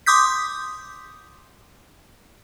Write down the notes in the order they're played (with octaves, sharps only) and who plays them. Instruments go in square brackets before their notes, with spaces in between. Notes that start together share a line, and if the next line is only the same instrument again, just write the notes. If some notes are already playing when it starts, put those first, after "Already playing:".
[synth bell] C6 D6 D#6 G6 B6